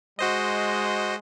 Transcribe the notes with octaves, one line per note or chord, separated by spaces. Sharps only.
G#3 F#4 C5 D#5